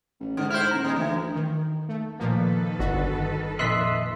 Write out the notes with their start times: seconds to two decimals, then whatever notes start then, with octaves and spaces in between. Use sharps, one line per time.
0.20 A1
0.37 G#2 D3
0.50 E4 C5 F6 G6
0.71 D#1 A#5
0.85 G3 G#3
0.96 D2 E3
1.35 D#3
1.89 A3
2.19 A#2 D#3 F3 A#3 A4 B4
2.79 G1 F#4
3.59 F2 A#2 D#5 E5 C6 F#6 B6